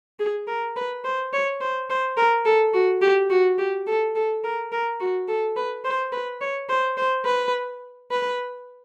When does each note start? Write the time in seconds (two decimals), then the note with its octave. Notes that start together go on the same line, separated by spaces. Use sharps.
0.20 G#4
0.47 A#4
0.76 B4
1.04 C5
1.33 C#5
1.61 C5
1.90 C5
2.17 A#4
2.46 A4
2.74 F#4
3.02 G4
3.30 F#4
3.58 G4
3.87 A4
4.15 A4
4.44 A#4
4.72 A#4
5.00 F#4
5.28 A4
5.56 B4
5.85 C5
6.12 B4
6.41 C#5
6.69 C5
6.97 C5
7.25 B4
8.11 B4